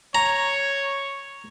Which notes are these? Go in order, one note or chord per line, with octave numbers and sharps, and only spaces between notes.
C#5 A#5